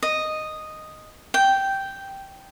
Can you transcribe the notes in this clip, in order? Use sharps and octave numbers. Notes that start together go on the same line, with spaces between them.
D#5
G5